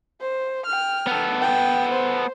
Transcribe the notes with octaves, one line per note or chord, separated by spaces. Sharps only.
C5
G5 F6
B3 A4
G5
C5